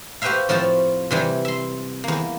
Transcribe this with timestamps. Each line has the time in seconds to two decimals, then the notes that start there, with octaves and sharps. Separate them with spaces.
0.22 F#4 G4 B4 C5 E5 F5
0.49 A2 F3 C4 F4 F#4 A5
1.11 C3 E3 G3
1.45 E5 C6
2.04 E2 A#3